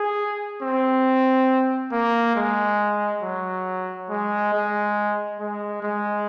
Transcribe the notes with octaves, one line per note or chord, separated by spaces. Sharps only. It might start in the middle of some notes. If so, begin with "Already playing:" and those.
Already playing: G#4
C4
A#3
G#3
F#3
G#3
G#3
G#3
G#3